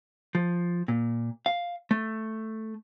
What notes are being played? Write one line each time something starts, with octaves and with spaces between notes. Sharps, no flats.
F3
A#2
F5
A3